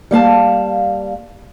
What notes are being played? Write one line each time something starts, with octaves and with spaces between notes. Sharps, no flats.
G3 A#3 F5 A5